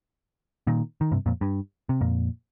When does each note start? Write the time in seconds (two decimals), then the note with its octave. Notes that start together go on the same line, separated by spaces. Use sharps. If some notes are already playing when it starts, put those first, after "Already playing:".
0.67 A#2 D#3
1.01 D#3
1.12 G2 C3
1.26 F2 A#2
1.41 G2
1.89 C3
2.01 F2 A#2